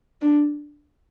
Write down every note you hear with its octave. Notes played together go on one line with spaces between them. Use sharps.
D4